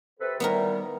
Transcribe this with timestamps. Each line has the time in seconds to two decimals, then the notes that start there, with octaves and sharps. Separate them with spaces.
0.19 C3 A4 B4
0.40 D#3 G3 B3 E4 A#4